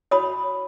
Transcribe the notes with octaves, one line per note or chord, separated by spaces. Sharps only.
F#4 C#5 B5 D#6